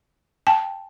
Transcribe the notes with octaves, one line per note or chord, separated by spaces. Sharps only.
G5 A5